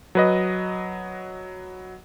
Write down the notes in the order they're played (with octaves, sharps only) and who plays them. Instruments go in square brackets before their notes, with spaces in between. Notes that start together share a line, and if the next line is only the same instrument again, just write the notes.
[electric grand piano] F#3 B4 D#5